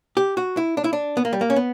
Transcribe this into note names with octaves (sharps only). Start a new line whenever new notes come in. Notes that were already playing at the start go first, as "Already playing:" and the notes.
G4
F#4
E4
D4
E4
D4
B3
A#3
G3
A#3
C#4
B3